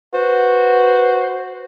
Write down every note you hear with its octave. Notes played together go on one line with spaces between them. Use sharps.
F#4 B4 C5